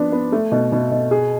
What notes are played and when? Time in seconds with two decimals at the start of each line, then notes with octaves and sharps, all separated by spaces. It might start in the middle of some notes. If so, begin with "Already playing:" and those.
Already playing: F3 B3 D4
0.12 B3
0.32 A3
0.52 B2
0.72 B2
0.91 B2
1.11 G#4